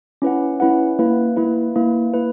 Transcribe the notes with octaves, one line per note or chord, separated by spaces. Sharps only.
C#4 E4 B4 F#5
C#4 E4 B4 F#5
A#3 E4 B4
A#3 E4 B4
A#3 E4 B4
A#3 E4 B4